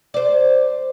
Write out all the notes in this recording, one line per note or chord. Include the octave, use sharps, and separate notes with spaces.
C5 D5